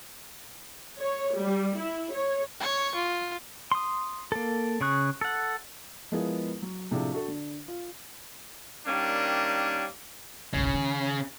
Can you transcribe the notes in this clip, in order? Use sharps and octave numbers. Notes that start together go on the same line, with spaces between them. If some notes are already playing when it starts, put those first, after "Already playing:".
C#5
G3
E4
C#5
C#5 C#6
F4
C6 D#6
A#3 A4
C#3 G#4 C#6 F#6
A4 F#5
F3 G#3 B3 E4 G#4 A#4
F#3
A2 C3 F3 D4 G#4
D4 F#4 A4
D3
F4
D#3 G3 A#3 C#4 D4
F#1 B1 C#3
D#3